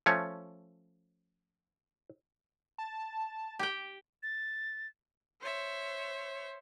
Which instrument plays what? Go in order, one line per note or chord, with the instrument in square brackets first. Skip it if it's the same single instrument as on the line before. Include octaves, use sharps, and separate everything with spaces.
[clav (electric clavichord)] F3 A3 C#4 C#5
[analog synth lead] A5
[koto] G4 G5
[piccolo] A6
[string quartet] C5 C#5 E5